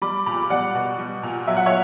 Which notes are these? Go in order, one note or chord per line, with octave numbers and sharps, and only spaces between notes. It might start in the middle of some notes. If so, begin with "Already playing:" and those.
G3 B5 D6
A#2 B5 D6
G3 D5 F#5
B2
G3
A#2
F#3 E5
F#5
C#5 E5